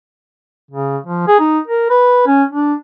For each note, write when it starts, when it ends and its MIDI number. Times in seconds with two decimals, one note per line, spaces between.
0.71 0.98 49
1.06 1.25 53
1.28 1.39 68
1.39 1.60 63
1.67 1.86 70
1.90 2.25 71
2.27 2.44 61
2.51 2.74 62